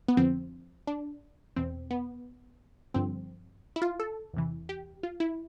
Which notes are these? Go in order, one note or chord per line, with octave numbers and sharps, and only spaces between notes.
B3
F2 D3 F3 C4
D4
E2 B2 C4
B3
G2 D3 F3 C4
E4
F4
A4
E2 C3 E3
G4
F4
E4